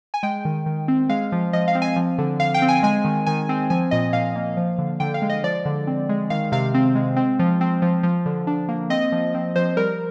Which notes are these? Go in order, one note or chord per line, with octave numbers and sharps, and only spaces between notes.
G#5
G#3 G5
D#3
D#3
C4
G#3 F5
F3
F3 D#5
F5
C4
G#5
F3
D3
D3 F5
G5
C4
G#5
G#3 G#5
D#3
D#3 G#5
C4
F3 G#5
A#2 D#5
A#2 F5
A#3
F3
D3
D3 G5
F5
G#3
D#5
F3 D5
D3
C4
G#3
D#3 F5
C3 F5
C4
G#3
C4
F3
C4
F3
F3
D3
D4
A#3
C4 D#5
F3
C4
F3 C5
G3 A#4